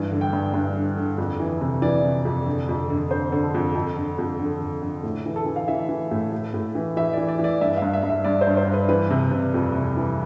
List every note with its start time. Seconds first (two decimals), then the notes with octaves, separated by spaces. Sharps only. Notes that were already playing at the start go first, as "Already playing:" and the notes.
Already playing: G2 E3
0.12 D3
0.21 G5
0.33 G2
0.54 G2
0.76 D3
0.97 D3
1.18 F2
1.40 E3
1.61 C3
1.82 E3 D5
2.04 C3
2.25 F2
2.46 D3
2.69 F2
2.90 D3
3.11 D3 C5
3.32 D3
3.43 A4
3.54 F2
3.75 F2 A4
3.97 D3
4.18 F2
4.39 D3
4.61 D3
4.82 D3
5.03 A2
5.26 E3
5.36 A4
5.46 E3
5.56 F5
5.68 E3 E5
5.89 E3
6.11 A2
6.32 A2
6.54 A2
6.75 E3
6.97 E3 E5
7.13 E3 D5
7.29 D5
7.39 E3
7.44 D5
7.61 G2 E5
7.77 F5
7.82 G2
7.93 E5
8.03 G2
8.10 E5
8.24 G2 D5
8.41 C5
8.47 G2
8.57 C5
8.67 G2
8.74 B4
8.89 E3 B4
9.10 C3
9.31 C3
9.54 F2
9.75 C3
9.97 E3